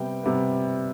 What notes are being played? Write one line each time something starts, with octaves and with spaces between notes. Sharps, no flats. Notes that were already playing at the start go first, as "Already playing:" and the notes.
Already playing: C3 G3 B3 G5
C3 G3 B3